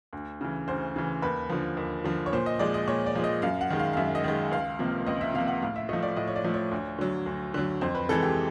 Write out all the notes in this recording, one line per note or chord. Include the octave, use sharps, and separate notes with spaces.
D2
C#3 E3
D2 C5
C#3 E3
D#2 B4
D3 F3
D#2
D3 F3
C#5
A#2 C5
D#5
F3 G#3 D5
D#5
A#2 C#5
D5
F3 G#3
D#5
F#2 F5
F#5
D#3 G#3
F5
F5
F#2 E5
D#5
D#3 G#3
C#2 F5
C3 F3 A#3
C#2 D#5
E5
C3 F3 A#3 F5
F#5
A2 F5
E5
F3 A3 D#5
D5
A2 D#5
C#5
D5
F3 A3
C#5
D2
D3 F#3
D2
D3 F#3
F2 C5
B4
C3 E3 G#3 A4
G4